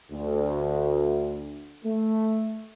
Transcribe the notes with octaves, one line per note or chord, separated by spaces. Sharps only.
D2
A3